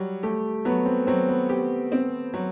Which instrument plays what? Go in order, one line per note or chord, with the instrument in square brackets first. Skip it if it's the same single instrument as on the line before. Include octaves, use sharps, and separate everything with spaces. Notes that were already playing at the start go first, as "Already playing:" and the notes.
Already playing: [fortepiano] F#3 [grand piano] G3
[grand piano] A3 [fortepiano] G4
[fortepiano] F#3 [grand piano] B3
[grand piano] C4
[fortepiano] F#3 [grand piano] C4
[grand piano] B3
[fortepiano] G4
C4
F#3